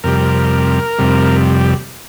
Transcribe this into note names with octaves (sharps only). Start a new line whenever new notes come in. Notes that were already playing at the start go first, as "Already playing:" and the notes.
F2 C3 G3 A#4
F2 C3 G3